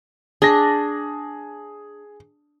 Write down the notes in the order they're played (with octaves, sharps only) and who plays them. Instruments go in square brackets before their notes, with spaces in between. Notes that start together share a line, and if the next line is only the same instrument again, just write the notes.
[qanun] D4 [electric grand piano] G#4 A#6